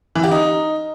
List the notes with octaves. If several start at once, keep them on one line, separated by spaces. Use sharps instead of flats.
E3
G4
D#4